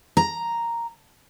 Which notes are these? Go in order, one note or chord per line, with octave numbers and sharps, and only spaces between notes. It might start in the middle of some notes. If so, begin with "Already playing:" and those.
A#5